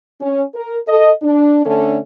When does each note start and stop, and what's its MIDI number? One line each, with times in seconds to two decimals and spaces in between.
0.21 0.43 61
0.55 0.78 70
0.87 1.10 69
0.87 1.10 75
1.22 1.65 62
1.66 1.98 50
1.66 1.98 57
1.66 1.98 61
1.66 1.98 62
1.66 1.98 69